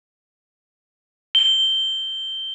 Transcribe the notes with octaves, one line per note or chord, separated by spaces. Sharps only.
G7